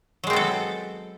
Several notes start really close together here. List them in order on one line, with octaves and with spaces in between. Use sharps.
F#3 G#3 C4 B3 A4